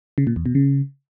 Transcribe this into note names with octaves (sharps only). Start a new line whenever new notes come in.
C#3
A#2
E2
B2
C#3